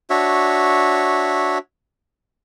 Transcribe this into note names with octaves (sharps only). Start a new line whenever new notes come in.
D4 F#4 C#5 E5